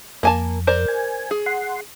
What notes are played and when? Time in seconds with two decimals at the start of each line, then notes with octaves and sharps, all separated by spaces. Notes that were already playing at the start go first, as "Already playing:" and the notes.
0.23 F2 A#3 G#5 A5
0.67 A#4 C5 D5
0.88 G#5
1.31 G#4
1.46 F#5 C6